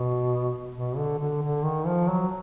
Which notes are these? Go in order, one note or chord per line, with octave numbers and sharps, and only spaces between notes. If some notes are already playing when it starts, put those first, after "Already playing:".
Already playing: B2
B2
D3
D3
D3
D#3
F3
F#3